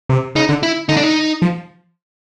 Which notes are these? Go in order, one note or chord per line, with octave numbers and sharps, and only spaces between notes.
C3
C#3 D#4
D3
E4
D3 D#4
D4
D#4
F3